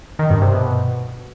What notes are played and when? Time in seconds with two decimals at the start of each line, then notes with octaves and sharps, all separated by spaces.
0.19 D#3
0.30 G2
0.42 C3
0.53 B2